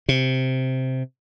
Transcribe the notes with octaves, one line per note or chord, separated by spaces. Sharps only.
C3